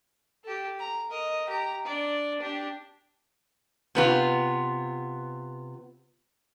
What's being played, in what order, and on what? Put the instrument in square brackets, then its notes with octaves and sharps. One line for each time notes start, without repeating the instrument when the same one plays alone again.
[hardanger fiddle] G4 A4
A#5
A#4 D#5
G4 A#5
D4 D5
D4 G4
[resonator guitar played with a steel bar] C3 B3 F4